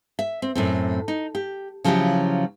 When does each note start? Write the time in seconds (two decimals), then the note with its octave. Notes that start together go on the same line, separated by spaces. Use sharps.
0.19 E5
0.42 C4
0.55 F#2 A2 C4
1.08 D#4
1.35 G4
1.84 C#3 F3 F#3 C#4 E4 G4